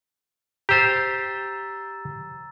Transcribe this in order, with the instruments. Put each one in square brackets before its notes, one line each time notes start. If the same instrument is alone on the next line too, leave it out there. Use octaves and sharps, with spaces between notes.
[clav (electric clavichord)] G4 C5 [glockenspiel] A#5 E6 A6